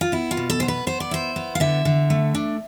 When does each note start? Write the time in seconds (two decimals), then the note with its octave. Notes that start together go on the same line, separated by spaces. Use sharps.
0.01 F4
0.12 B3 E4
0.31 F4
0.37 B2
0.50 A4
0.60 B3 C5
0.68 B4
0.87 B3 C5
1.00 D5
1.11 E4 C5
1.36 B3
1.55 F5
1.60 D3 E5
1.85 D3
2.10 A3
2.35 D4